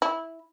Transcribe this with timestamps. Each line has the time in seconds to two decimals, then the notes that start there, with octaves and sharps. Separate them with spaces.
0.02 E4